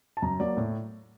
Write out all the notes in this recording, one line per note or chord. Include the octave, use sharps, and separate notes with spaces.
A5
F#2 A#5
F#3 A#3 D5
A2